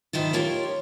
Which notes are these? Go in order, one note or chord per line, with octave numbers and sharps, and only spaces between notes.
G#2 D#3 E4 F4
F4 G4 A#4 C#5